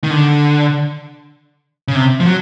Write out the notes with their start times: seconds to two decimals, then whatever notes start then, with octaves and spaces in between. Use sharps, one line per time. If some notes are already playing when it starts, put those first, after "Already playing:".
0.04 D#3
0.11 D3
1.88 C#3
1.95 C3
2.20 F3
2.26 F#3